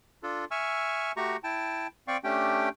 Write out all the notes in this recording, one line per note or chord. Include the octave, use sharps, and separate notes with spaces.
D4 F4 A4
E5 G#5 C#6 E6 F6
A3 F#4 G4 A#5 C#6
E4 G5 A5
C4 D5 F5 G5 C#6
A3 C#4 D4 G4 G5